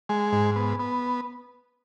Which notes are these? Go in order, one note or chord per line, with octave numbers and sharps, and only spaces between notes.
G#3
G#2
B3
B3